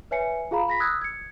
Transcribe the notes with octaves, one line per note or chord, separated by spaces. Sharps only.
B4 C#5 E5 G#5 C7 C#7
F4 G#4 F5 A#5 B5
B5 A#6 B6
D#6 E6 F#6 G#6
G#6 C#7